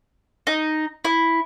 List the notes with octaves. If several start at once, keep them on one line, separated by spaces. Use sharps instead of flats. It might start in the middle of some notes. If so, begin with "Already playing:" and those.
D#4
E4